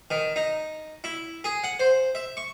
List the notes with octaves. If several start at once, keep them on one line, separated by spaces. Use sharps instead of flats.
D#3
D#4
E4
G#4
F#5
C5
E5
C#6